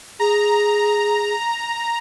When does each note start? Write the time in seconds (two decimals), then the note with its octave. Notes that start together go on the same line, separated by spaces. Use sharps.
0.20 G#4 A#5